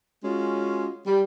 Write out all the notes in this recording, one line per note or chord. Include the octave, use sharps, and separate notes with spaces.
G#3 C#4 F4 F#4
G3